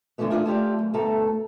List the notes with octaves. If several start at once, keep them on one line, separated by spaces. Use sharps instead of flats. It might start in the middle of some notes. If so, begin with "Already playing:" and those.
A#2 D3 E3 F#3 A3 B3
D4 F4 G#4 D#5 F#5
A3 F4 G4 D5
F#2
D2 G2 B2 A3 A4 A#5